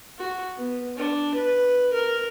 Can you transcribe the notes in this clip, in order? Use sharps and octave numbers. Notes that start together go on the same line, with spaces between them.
F#4
B3
D4
B4
A#4